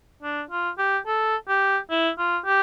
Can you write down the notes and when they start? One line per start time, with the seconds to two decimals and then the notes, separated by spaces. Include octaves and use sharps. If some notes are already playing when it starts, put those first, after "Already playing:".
0.22 D4
0.50 F4
0.78 G4
1.06 A4
1.48 G4
1.90 E4
2.18 F4
2.45 G4